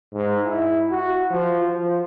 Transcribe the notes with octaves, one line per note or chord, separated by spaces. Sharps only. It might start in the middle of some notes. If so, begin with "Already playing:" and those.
G#2
E4
F#4
F3
F3